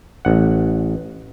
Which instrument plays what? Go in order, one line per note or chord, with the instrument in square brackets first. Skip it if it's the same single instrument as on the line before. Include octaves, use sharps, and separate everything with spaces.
[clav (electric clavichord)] A1 F#5